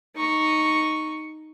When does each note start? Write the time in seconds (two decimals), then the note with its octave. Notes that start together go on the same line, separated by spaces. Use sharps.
0.16 D#4 C#6